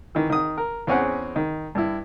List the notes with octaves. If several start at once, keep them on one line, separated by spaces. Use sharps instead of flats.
D#3 E3
D#3 D#6
A#4
E2 C4 C#4 G#4 F#5
D#3
G2 E4